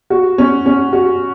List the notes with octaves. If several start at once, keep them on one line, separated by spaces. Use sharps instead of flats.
F#4
C#4
C#4
F#4